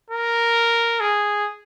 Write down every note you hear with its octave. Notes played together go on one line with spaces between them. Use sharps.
A#4
G#4